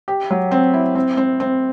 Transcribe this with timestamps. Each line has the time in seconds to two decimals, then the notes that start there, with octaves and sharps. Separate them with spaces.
0.08 G4
0.31 F#3
0.51 C4
0.74 E4
0.95 C4
1.17 C4
1.40 C4